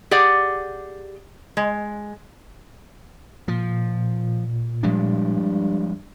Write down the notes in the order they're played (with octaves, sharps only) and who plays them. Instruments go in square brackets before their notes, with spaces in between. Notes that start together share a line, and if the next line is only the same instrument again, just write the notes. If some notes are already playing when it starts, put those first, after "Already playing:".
[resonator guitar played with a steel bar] G4 G#4 D5 F#5
G#3
[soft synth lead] A#2 [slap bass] F3
[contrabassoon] G2 [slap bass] F3 G#3 D4